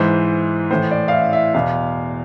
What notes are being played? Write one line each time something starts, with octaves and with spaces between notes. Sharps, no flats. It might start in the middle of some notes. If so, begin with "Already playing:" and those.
Already playing: G#2 E3 C5
A2 E3 C5
D5
F5
E5
E5
E2 B2 F5